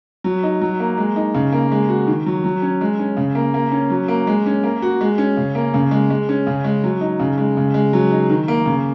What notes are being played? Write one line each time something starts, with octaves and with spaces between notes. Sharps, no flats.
F#3
D#4
F#3
A#3
G#3
D#4
C#3
A#3
G#3
F#4
D#3
F#3
F#3
C#4
G#3
C#4
C#3
A#3
A#3
C#4
F#3
A#3
G#3
C#4
A#3
F#4
G#3
C#4
C#3
A#3
C#3
G#3
G#3
C#4
C#3
G#3
F#3
D#4
C#3
G#3
C#3
G#3
F#3
D#4
D#3
A#3
C#3